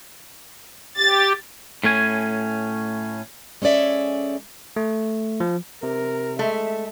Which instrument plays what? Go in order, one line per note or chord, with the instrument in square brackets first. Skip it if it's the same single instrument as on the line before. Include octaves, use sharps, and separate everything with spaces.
[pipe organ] G4 [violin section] A6
[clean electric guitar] A2 A3 C#4 G#5
[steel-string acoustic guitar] G#3 C#4 A4 D5 E5
[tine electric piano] A3
F3
[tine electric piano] C3 [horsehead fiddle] A#4
[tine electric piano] G#3 [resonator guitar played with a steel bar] A3 [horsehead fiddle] E5